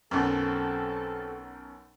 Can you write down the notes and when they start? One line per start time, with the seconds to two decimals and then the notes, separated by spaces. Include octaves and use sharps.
0.11 B1 F#2 C4 A4